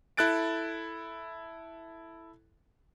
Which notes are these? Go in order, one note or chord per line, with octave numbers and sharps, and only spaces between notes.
E4 A4 F#6 A6 D7